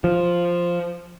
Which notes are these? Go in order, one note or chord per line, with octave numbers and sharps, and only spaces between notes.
F3